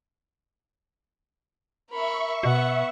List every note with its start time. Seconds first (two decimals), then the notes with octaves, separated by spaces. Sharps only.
1.90 A#4 E5 B5 C#6
2.43 B2 B3 F#5